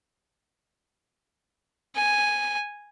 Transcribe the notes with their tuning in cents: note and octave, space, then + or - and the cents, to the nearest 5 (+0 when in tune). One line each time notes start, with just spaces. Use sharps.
G#5 -5